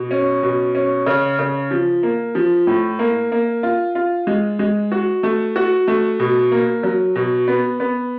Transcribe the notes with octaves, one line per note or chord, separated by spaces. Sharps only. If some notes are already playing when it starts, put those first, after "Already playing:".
Already playing: B2
C#4
B2
C#4
C#3
C#3
F3
A#3
F3
A2
A#3
A#3
F4
F4
G#3
G#3
F#4
A3
F#4
A3
B2
A#3
F#3
B2
B3
B3